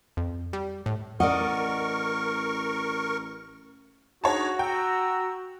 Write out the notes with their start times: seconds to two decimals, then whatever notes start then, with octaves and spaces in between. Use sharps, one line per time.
0.17 F2
0.53 G3
0.86 A2
1.20 A1 A#4 D5 D#5 F#5 C#6
4.24 D4 D#4 F#4 G#4 C#5 A5
4.59 F#5 G5 A#5 E6